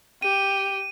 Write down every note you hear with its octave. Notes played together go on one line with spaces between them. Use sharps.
G4 D#7